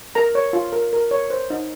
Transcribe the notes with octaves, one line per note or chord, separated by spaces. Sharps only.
A#4 A#5
C#5
F4
A#4
A#4
C#5
C5
D#4